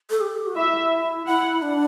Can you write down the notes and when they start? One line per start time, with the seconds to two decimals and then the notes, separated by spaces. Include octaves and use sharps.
0.10 A4
0.21 G4
0.47 F#4
0.56 E4 E5
1.26 E4 F#5
1.62 D4